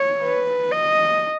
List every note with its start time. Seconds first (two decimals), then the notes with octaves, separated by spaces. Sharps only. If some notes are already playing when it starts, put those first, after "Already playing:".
Already playing: C#5
0.23 B4
0.72 D#5